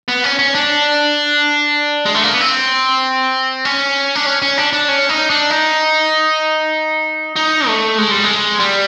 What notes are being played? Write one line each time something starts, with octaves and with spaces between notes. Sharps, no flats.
B3
C#4
C#4
D4
G#3
A3
A#3
B3
C4
C#4
D4
C#4
C#4
D4
D4
C#4
D#4
D4
D#4
D#4
A3
G#3
G3
G#3
G3